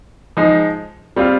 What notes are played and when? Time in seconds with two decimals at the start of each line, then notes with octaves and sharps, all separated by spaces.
0.37 F3 G#3 D#4
1.16 G3 C4 F4